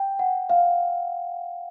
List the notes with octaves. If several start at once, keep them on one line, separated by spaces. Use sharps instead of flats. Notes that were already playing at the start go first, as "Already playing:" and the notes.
Already playing: G5
F#5
F5